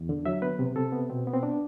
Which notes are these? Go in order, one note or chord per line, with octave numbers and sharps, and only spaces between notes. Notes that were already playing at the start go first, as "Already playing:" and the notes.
Already playing: E2
D3
F#3 E5
B3 B4
C3
C3 A4
B3
B2 C4
B3
C4
D4